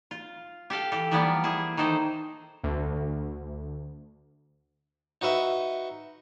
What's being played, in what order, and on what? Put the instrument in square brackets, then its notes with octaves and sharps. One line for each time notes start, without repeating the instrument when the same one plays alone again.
[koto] F4
G4 A4 F5 G5
E3 G4 A4
E3 F3 G3 A#3 B3 D5
E4 G#4
D#3 E3 D#4 A4 C5
[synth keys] D2
[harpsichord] D#4 F#4 B4 E5